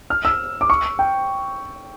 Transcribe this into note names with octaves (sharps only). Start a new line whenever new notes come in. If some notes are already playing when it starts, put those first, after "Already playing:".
F6
E6
D6
C#6
G5